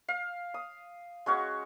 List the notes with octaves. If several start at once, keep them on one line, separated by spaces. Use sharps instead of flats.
F5
D#6
G#3 C#4 F#4 C#5